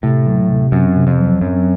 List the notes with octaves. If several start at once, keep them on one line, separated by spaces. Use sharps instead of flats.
A2 C3
F#3
C3
F#2 C4
C3
F2
F#3
F#2 C4